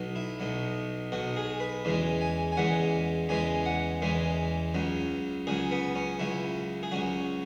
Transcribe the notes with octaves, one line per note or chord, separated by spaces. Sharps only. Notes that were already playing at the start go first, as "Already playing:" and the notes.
Already playing: B1 B2 F#3
E4
B1 B2 F#3
B1 B2 F#3 F#4
G#4
B4
E2 C#3 E3 G#3
G#5
G#5
E2 C#3 E3 G#3 F#5
E2 C#3 E3 G#3 G#5
F#5
E2 C#3 E3 G#3
C#2 C#3 F#3
C#2 C#3 F#3 G#4
B3
C#4
C#2 C#3 F#3 E4
G#4
C#2 C#3 F#3 F#4